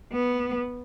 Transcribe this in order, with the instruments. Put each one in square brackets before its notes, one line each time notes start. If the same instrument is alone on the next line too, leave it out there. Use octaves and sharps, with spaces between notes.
[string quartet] B3